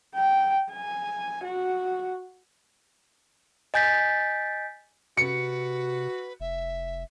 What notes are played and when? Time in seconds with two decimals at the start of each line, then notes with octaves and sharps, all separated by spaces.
0.15 G5
0.73 G#5
1.44 F#4
3.74 D#5 G#5 G6 A6 B6
5.17 C3 F#4 B4 C#7
6.40 F1 E5